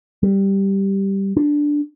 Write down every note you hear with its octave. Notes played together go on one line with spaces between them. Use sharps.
G3
D4